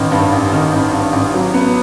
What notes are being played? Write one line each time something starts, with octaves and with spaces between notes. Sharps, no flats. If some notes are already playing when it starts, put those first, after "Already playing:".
Already playing: A1 D#3
G2
A1
D#3
A1
G2
A1
F#3
B3